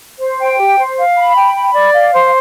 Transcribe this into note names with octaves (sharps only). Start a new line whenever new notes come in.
C5
G5
G4
C5
F5
B5
G5
B5
D5
F5
C5